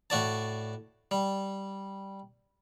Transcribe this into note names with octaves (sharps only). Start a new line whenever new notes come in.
A2 F#4 D5 A5
G3